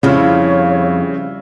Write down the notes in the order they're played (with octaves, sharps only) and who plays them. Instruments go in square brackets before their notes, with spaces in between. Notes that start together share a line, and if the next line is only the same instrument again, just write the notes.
[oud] F2 F3 [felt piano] C#3 [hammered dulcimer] G3 E4 [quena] C#5